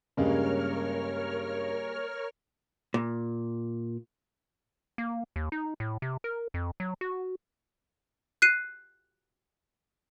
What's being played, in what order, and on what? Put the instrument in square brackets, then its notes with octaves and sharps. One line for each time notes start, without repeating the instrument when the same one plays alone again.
[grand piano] G2 C#3 [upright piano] G3 G#3 A#3 [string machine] A#4 C#5 F6
[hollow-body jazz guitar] A#2
[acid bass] A#3
D#2
D#4
A2
C3
A#4
F2
F#3
F#4
[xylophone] F#6 C7 D#7